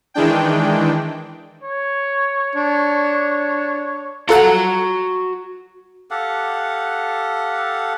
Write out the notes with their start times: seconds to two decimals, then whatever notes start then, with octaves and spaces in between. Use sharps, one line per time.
0.14 D#3 E3 G#3 D4 G5
1.64 C#5
2.55 D4
4.29 F4 F#4 A4 F#5 A#5
6.11 G4 A4 F5 F#5